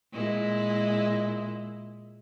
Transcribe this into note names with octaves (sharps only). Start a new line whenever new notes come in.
A#2 G#3 E4